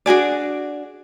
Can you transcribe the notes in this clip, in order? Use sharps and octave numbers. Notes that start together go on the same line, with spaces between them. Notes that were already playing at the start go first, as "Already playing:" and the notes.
D4 F#4 G#4 D5